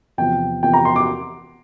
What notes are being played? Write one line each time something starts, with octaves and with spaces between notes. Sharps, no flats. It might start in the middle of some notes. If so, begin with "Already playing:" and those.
E2 C3 F3 G5
E2 C3 F3 G5
A#5
C6
D6